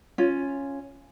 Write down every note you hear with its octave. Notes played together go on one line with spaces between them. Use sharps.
C#4 F4